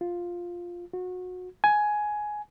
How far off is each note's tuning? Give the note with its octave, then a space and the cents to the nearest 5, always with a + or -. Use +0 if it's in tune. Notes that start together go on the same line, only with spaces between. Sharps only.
F4 +5
F#4 -25
G#5 +10